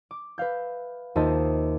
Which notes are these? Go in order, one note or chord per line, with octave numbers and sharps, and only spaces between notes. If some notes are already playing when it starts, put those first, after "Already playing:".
D6
B4 E5 F5 G6
D#2 F4 C5 D#5 E5 A5